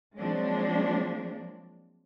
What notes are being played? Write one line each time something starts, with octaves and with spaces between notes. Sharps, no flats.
F3 F#3 G#3 A#3 C4 D4